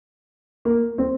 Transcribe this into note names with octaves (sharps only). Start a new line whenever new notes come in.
A#3
C4